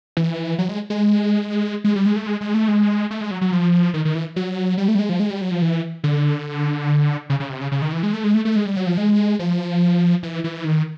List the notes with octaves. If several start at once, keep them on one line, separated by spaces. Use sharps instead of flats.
E3
F#3
G#3
G#3
G#3
G3
G#3
A3
G#3
G#3
A3
G#3
A3
G#3
F#3
F#3
F3
D#3
D#3
E3
F#3
G3
A3
G3
G#3
F3
G#3
G3
F#3
F3
E3
D3
C#3
C#3
C3
C#3
C#3
D#3
E3
G#3
A3
G#3
A3
A3
G#3
G3
F#3
F3
G#3
F3
E3
E3
D#3